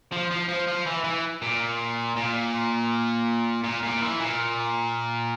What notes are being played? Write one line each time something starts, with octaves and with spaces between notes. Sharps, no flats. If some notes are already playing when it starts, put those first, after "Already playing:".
F3
F3
F3
F3
E3
E3
A#2
A#2
A#2
A#2
E3
A#2